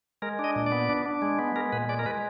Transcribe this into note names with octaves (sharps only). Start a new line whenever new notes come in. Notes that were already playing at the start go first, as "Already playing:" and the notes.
G#3 A#4
D4
D#5
A#2
D5
B3
D4
D4
G#3
B3
G#3 A#4
A#2 B4
G#3 D5
A#4
G#3 B4